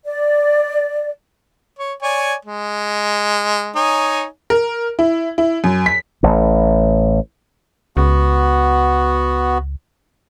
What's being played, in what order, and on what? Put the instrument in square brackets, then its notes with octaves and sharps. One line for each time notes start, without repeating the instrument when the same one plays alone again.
[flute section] D5
[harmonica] C#5
C#5 D5 G#5
G#3
D#4 C#5 G#5
[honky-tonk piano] A#4
E4
E4
F#2
B6
[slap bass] A1 A2
[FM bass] C#2 [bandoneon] B3 F#4